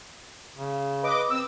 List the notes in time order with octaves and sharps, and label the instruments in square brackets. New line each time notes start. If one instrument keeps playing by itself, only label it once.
[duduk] C#3
[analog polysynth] B4 D#5 D6
[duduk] C4 [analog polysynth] E6